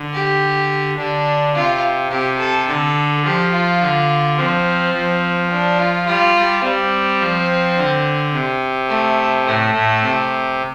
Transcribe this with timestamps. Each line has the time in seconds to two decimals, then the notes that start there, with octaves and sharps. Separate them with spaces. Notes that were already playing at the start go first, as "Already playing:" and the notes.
Already playing: D3
0.14 G4
0.98 D3 D4
1.55 C3 F4
2.11 C3 G4
2.39 A4
2.68 D3 A4
3.24 F3 G4
3.52 F4
3.81 D3
4.37 F3 C4
4.94 F3
5.50 D4
5.79 F4
6.07 G3 F4
6.35 G3
6.63 G3 C4
7.20 F3
7.77 D3
8.33 C3
8.90 A3
9.46 A2 A3
9.74 A2
10.03 C3